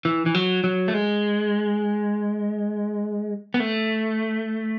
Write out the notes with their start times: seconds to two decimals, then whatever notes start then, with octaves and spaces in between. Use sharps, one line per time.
0.05 E3
0.26 E3
0.35 F#3
0.64 F#3
0.88 A3
0.94 G#3
3.54 B3
3.60 A3